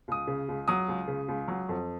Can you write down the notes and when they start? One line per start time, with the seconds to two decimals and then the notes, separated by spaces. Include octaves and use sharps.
0.08 C#2 D#6
0.27 C#3
0.49 C#2
0.68 F#3 D#6
0.88 C#2
1.08 C#3
1.28 C#2
1.48 F#3
1.69 F2